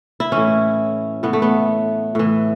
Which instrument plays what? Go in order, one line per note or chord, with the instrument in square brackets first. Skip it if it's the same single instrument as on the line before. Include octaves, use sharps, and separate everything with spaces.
[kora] E4
A2 E3 C#4
A2 E3 B3
A3
B3
A2 E3